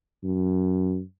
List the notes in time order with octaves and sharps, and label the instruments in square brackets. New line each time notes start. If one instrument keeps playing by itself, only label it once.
[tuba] F#2